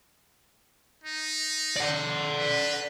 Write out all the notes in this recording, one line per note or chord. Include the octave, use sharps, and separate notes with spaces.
D#4
D5 F#5
B4